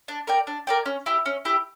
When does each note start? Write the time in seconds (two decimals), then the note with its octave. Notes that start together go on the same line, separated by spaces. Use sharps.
0.08 D4
0.27 A#4 D5 G5
0.47 D4
0.67 A#4 D5 G5
0.86 C#4
1.06 E4 G4
1.26 C#4
1.45 E4 G4